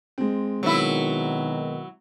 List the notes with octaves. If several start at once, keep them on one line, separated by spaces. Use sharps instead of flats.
G#3 C4
B2 D#3 F#3 E4